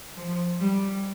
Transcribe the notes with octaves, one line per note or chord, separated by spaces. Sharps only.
F3
G3